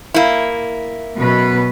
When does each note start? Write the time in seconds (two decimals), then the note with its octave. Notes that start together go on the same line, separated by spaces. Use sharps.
0.14 A#3 E4
1.17 F#2 B2 B4